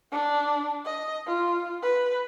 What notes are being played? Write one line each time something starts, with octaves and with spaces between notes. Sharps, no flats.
D4
D#5
F4
B4